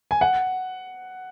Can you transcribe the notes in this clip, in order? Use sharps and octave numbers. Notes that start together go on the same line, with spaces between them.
G#5
F#5